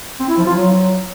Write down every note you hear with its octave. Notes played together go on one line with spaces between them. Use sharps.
C4
E4
F3
F4
F#3